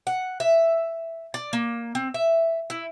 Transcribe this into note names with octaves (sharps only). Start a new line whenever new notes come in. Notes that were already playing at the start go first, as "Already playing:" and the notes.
F#5
E5
D5
A#3
C4
E5
E4